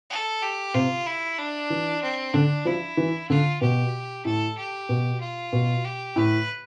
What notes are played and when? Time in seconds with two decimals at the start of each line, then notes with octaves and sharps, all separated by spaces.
0.10 A4
0.43 G4
0.74 C3 F4
1.06 E4
1.39 D4
1.70 E3
2.03 C4
2.34 D3 D4
2.65 F3 E4
2.97 E3
3.29 D3 F4
3.61 B2 G4
4.25 A2 A4
4.58 G4
4.89 B2
5.21 F4
5.52 B2
5.85 G4
6.16 A2 B4